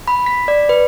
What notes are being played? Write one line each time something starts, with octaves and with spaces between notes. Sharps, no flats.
B5
B6
D5
B4